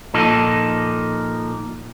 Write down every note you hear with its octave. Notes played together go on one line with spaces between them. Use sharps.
A#2 F3 D#4 A4